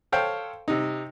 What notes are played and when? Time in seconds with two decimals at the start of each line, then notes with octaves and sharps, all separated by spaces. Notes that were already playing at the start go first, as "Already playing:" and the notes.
0.12 A4 C5 C#5 F5 G5
0.68 C3 D#4